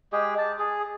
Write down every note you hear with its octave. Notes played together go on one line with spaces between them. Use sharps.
G#3 G4 G#4
A5
G#4